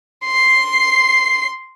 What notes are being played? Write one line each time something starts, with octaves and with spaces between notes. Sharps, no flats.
C6 C7